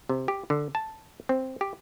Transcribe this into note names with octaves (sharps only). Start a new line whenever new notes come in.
C3
G4
D3
A5
C4
G4